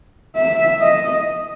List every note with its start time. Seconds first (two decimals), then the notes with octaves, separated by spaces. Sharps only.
0.36 E5
0.82 D#5